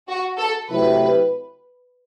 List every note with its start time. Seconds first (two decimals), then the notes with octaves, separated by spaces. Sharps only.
0.08 F#4
0.38 A4
0.69 C3 F#3 A3 E4 G4 B4